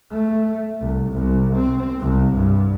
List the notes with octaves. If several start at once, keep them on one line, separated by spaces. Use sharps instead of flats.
A3
C2
C2
C4
C2
G2